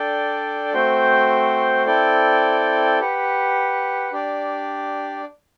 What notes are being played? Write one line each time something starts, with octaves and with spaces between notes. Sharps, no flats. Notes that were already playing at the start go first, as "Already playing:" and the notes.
Already playing: D4 A4 D5 G5
A3 C4 F#4 C5 G5
C4 E4 A4 D5 G5
G4 B4 F#5
D4 G4 D5